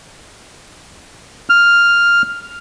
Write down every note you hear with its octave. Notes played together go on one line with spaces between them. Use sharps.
F6